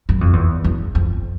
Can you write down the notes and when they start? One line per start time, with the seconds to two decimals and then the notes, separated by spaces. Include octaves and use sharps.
0.09 F#2
0.21 F2
0.33 E2
0.64 E2
0.95 F2